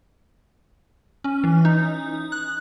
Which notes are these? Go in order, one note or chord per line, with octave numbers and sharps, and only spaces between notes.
C#4
E3
D#4
F#6